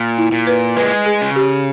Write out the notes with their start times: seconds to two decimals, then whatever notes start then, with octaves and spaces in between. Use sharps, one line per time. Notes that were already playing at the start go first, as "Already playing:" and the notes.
Already playing: A#2
0.18 E4
0.32 A#2
0.47 B4
0.77 G#3 B4
1.06 G#4
1.21 C#3
1.36 G4